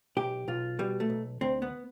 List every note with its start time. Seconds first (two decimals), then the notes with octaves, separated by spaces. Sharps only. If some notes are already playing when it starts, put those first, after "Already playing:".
0.17 B1 G4
0.48 B1 F4
0.79 B2 G3
1.00 A3
1.10 B1
1.41 D2 C4
1.62 B3